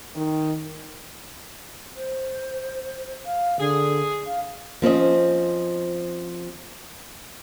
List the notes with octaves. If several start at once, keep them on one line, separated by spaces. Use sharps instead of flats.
D#3
C5
F5
D3 G#4
F5
F3 C4 C#4 D#5